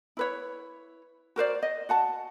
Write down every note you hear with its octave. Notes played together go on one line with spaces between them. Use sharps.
E4 B4 C#5
F#4 A#4 C5 D5
D#5
F#4 F#5 A5